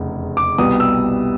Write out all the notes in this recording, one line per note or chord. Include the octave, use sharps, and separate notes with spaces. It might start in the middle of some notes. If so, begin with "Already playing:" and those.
Already playing: F1 E2 C#3
D6
C2 B2 G3 B3 D#6
E6